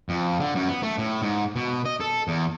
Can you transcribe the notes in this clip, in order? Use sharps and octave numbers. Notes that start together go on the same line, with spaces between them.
F2
D3
F#2
B3
A3
A2
G#2
B2
D#5
A4
E2